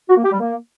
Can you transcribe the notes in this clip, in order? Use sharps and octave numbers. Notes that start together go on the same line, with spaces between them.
F#4
A#3
G4
G3
A#3